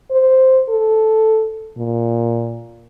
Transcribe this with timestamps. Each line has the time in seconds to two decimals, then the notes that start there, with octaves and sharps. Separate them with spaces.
0.11 C5
0.69 A4
1.78 A#2